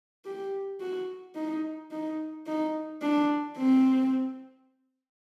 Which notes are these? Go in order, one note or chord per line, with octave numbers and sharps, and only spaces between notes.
G4
F#4
D#4
D#4
D#4
D4
C4